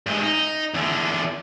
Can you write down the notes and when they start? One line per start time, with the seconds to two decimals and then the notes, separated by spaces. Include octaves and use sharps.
0.06 G2 G#3
0.24 D#4
0.74 E2 D3